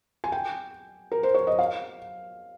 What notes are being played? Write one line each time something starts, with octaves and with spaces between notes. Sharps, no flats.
G#5
G5
A#4
C5
C#5
D#5
F5